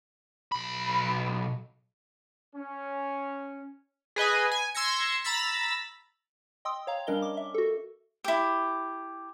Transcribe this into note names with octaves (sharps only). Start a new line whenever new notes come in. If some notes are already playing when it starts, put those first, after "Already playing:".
B1 B5
C#4
G#4 B4 D#5 G#5
G#5
C6 E6 G#6 A#6 C#7
A#5 B5 E6 A6 B6
D#5 G5 C6 D#6 E6
C#5 F5 A#5
G3 C#4 D4 A#4 D#5 G7
D6
E5
F#4 A4
E4 G4